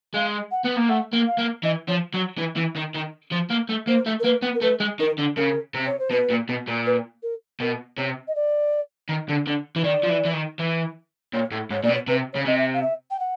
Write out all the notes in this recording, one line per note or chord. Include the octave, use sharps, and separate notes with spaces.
G#3 F5
F#5
B3
A#3
A3 F#5
A#3
F5
A#3
E3 D#5
F3 C#5
F#3
E3
E3
D#3
D#3
F3
A#3
A3
A#3 C5
A3
A#4
A#3 B4
B3
A#4
A3 B4
G#3
D#3 A#4
D3
C#3 A#4
C3
C#5
C5
B2 B4
A#2
B2
A#2
B4
A#4
B2 A#4
C3 C#5
D#5
D5
D#3
D3
D3
E3
D#3 D5
F3
E3
E3
D#3
E3
A#2 C#5
A2
G#2 C#5
A#2 D5
B2
C#5
C3 B4
C#3 C#5
C3 D#5
E5
F5
E5
G5
F#5